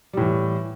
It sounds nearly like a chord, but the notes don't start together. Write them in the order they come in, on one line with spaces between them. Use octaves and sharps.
G3 A2 E3